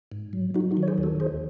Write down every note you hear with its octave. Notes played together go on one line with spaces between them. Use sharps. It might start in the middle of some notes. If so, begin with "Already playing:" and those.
G#2
F#3
F#3 D#4 F#4
D#4 F#4
D#3
C#5
G#4 C5
D#2
F#4 A4
D#2 G#4 C5